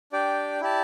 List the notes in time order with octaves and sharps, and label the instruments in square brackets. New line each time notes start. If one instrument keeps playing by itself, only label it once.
[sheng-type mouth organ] D4 G4 D5 G5
E4 G4 D5 A5